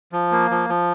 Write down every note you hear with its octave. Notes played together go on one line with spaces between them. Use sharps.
F3
A#3
F3
F3